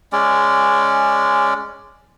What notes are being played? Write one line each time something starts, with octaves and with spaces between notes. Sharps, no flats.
G#3 C#4 D5